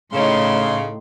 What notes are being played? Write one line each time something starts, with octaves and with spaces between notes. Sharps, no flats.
A2 C#3 D#4 C6